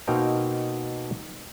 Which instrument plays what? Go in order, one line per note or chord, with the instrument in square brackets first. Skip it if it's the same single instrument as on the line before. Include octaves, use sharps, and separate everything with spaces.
[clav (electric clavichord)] B2 A#3 C4 D#4 G5 A#5